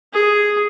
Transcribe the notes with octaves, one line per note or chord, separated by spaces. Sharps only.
G#4